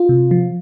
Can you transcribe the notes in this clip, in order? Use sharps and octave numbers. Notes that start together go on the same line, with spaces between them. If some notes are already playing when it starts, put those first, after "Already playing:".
Already playing: F4
C3
F3